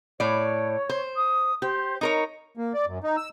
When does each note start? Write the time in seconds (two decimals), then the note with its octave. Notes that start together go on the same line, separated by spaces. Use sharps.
0.20 A2 C#5 D5
0.89 C5
1.16 D#6
1.62 G4 C5
2.01 D#4 A#4 C#5 A#5
2.57 A#3
2.74 D5
2.87 F#2
3.04 D#4
3.17 E6